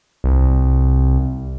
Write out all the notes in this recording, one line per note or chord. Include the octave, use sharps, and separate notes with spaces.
C2